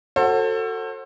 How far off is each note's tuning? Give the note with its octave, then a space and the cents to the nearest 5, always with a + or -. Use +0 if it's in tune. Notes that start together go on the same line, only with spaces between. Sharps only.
F#4 +0 A4 +25 C5 +35